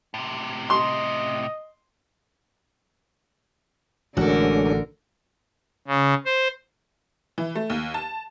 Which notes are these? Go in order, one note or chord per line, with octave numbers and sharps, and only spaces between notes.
A2 C3
D#5 C6
A1 D3 G#3 D4 F#4 A4 A#4 C#5
C#3
C5
E3
A3
D#2
A5